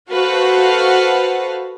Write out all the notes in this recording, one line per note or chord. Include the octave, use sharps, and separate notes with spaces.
F#4 A4 B4 C5 F5 F#5